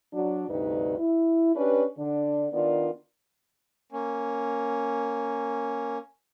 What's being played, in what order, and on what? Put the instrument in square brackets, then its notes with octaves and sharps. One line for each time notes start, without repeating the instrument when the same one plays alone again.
[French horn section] F#3 D4 F#4
D2 G2 C3 D#4 B4
E4
C#4 D4 G4 B4
D3 D4
D#3 B3 D4 F4 A#4 D5
[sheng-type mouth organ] A#3 C#4